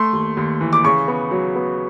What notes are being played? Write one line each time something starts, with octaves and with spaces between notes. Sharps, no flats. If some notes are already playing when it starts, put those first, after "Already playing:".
Already playing: A3 C6
D#2
D#2
E3
D6
C#3 C#6
B3
F#3
B3